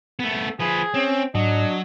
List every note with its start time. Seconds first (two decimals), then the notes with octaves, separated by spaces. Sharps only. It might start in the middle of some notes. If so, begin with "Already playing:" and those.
0.19 A3 B3
0.60 F3 G#4 B4
0.94 C4 C#4
1.35 G#2 F#3 D4 D#5